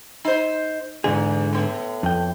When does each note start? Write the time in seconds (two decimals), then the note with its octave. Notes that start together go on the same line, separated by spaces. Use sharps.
0.25 D#4 C5
1.04 E2 G#2 D3 G#4
1.53 A2 B3
2.03 F2 G5